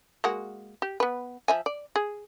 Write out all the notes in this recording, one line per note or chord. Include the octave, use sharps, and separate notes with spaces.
G#3 A#3 F#4
G4
B3 B4
F3 E5 G#5
D5
G#4